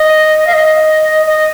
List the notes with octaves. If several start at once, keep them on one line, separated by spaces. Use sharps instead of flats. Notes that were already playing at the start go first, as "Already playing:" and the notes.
Already playing: D#5
F5
D#5
D#5